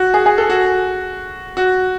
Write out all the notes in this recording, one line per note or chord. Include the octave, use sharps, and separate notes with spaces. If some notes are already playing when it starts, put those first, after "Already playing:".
Already playing: F#4
G#4
G#4
A4
F#4
F#4